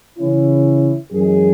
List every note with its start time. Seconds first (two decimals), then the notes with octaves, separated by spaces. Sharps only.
0.18 C#3 E3 C#4 E4
1.12 F#2 E3 G#3 G#4